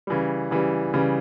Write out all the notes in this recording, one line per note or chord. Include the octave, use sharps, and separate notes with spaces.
C#3 E3 G3
C#3 E3 G3
C#3 E3 G3